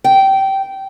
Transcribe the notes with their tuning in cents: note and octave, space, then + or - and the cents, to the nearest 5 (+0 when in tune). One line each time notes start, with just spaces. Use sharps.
G5 -20